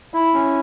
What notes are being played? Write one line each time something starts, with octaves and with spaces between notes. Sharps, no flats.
E4
C#4